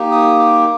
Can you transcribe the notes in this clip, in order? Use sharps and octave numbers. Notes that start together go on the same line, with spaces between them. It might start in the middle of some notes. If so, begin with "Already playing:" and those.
Already playing: A#3 D#4 G4
D#6
D6